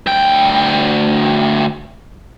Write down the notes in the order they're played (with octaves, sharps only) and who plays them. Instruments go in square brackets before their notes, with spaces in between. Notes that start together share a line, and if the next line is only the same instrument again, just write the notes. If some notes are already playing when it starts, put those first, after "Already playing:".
[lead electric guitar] D2 G5